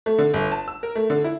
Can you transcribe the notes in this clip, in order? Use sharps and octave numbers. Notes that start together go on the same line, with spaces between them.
A3
D3
G1
A5
E6
A#4
A3
D3
E4